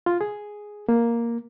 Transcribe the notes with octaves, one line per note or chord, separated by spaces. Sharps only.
F4
G#4
A#3